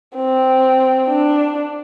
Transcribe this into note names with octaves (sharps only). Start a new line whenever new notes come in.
C4
D4